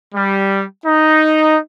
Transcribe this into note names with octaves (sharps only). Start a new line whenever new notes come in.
G3
D#4